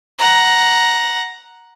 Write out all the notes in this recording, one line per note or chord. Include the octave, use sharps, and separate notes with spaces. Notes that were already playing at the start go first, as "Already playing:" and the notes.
F#5 A#5